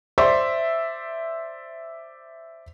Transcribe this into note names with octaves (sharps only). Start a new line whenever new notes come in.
C5 D5 E5 C6